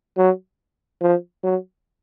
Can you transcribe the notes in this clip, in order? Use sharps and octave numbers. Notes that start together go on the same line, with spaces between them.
F#3
F3
F#3